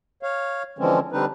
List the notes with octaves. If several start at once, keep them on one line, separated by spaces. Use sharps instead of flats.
C#5 F5
D3 E3 F3 G#3 C4 C#4
D3 G3 C4 D4 D#4 B4